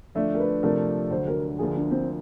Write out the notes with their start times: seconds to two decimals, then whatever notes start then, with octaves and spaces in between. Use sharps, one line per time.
0.15 D3 F3 A3 D4 E5
0.34 A#4
0.40 B4
0.63 C3 F3 A3 D4 A#4
1.11 D2 D3 F#3 C5
1.27 A#4
1.58 D2 D3 F3 A#3 G#4
1.75 D4
1.91 C4